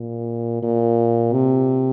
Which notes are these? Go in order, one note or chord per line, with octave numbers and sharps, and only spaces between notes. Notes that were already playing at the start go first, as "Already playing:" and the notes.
Already playing: A#2
A#2
C3